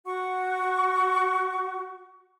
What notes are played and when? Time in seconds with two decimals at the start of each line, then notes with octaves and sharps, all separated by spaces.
0.06 F#4 F#5 C#6